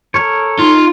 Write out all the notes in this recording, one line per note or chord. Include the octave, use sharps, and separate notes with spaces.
A4 A#4 C#5
D#4 F4